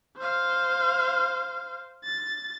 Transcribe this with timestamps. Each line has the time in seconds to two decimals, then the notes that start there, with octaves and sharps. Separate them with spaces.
0.17 C5 F5
2.04 A6